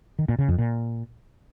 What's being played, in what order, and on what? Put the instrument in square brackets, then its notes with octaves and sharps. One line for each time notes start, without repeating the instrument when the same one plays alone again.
[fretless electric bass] D#3
A#2
C#3
F2
A#2